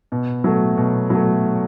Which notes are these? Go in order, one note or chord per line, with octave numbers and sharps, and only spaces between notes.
B2
F#3 A3
B2
F#3 A3